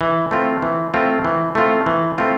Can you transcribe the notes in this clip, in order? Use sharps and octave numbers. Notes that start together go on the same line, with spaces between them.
E3
A3 C4 F4
E3
A3 C4 F4
E3
A3 C4 F4
E3
A3 C4 F4